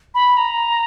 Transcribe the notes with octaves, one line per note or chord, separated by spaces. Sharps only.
B5
A#5